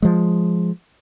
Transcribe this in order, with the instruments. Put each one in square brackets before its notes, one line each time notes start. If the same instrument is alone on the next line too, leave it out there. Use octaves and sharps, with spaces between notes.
[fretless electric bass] F3 G#3